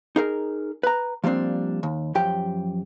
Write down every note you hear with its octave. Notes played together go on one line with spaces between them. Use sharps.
D#4 G#4 A#4
B4 A#5
F3 G3 A#3 C4 D4
D#2
F#2 F3 G4 G5